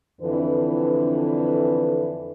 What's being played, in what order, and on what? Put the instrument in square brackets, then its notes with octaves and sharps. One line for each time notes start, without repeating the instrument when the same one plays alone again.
[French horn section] F2 D3 E3 B4